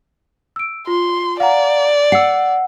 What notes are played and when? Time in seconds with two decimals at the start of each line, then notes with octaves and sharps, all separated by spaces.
0.56 E6 D7
0.87 F4 C6
1.40 D5 F5 F#5 A#5
2.12 F#5 E6 C7